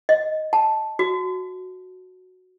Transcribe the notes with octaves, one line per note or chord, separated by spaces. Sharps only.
D#5
A5
F#4